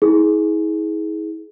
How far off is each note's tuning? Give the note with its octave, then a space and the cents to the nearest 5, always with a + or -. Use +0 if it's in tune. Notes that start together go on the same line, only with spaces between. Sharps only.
E4 -45 G#4 +15